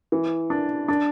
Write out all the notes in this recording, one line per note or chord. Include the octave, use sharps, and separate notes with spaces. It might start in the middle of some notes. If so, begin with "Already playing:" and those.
E3
D4
D4